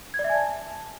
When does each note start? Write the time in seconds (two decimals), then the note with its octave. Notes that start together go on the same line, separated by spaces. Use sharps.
0.14 G#6
0.19 D5
0.24 E5
0.30 G#5
0.35 A5